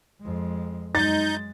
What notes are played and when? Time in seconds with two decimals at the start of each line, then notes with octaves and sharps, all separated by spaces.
0.21 F2 G#3
0.95 F#2 G#3 D#4 G6 A6